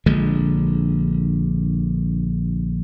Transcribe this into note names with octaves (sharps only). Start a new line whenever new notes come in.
A#1 D3 G#3